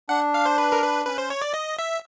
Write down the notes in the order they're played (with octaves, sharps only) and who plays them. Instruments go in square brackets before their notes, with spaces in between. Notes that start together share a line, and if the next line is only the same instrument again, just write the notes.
[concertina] D4 [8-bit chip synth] F#5
[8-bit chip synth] F5
C5
B4
A#4
B4
[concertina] C#4 [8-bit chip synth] B4
[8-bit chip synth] C5
C#5
D5
D#5
E5